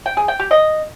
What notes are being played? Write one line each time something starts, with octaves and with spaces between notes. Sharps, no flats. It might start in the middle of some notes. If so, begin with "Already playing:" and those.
G5
G#4
G5
G4
D#5